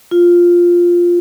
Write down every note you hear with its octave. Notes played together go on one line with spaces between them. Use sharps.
F4